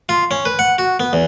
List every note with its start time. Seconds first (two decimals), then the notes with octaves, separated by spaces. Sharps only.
0.09 F4
0.31 C#4
0.45 B4
0.59 F#5
0.78 F#4
1.00 B3
1.13 E2